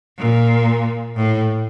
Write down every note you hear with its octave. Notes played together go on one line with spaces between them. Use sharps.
A#2
A2